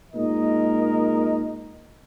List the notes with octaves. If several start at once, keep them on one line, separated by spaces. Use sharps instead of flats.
A#2 G#3 D#4 A#4 D#5